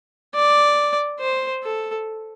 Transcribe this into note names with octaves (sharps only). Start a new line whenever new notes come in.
D5
C5
A4